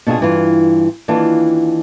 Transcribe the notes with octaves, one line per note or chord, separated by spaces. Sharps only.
B2 D4 F4 G#4
G2 E3 F4
D#2 E3 D4 F4